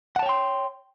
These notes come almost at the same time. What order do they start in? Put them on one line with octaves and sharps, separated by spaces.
F#5 A5 C#5 G5 C6